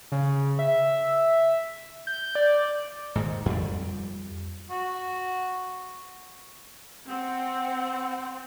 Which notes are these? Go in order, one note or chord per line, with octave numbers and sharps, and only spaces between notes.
C#3
E5
G6
D5
G#2 D#3
F2 G3
F#4
C4 F#5